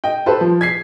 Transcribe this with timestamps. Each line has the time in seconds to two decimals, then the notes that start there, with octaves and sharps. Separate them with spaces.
0.04 D#5 G5
0.26 G4 A4 B4 C5 A5
0.41 F3
0.61 G#6 B6 C7